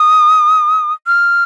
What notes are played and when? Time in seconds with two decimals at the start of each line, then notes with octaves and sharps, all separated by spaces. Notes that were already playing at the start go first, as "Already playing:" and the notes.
Already playing: D#6
1.07 F6